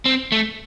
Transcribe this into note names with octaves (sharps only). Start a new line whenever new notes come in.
C4
A3